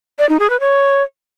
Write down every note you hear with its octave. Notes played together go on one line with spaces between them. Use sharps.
D5
D#4
G#4
B4
C#5